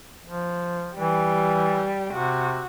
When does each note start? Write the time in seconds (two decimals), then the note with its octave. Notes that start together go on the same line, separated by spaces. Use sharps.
0.25 F3
0.97 E3 G3
2.13 C3 F#4